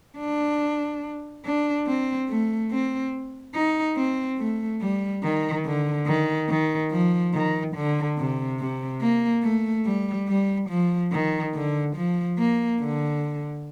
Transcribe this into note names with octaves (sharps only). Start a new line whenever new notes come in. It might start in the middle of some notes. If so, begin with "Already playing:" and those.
D4
D4
C4
A3
C4
D#4
C4
A3
G3
D#3
D3
D#3
D#3
F3
D#3
D3
C3
C3
A#3
A3
G3
G3
F3
D#3
D3
F3
A#3
D3